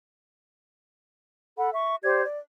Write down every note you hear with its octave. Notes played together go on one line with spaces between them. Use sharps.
A4 F#5 B5
E5 C#6
G4 C5 D5 G#6
D5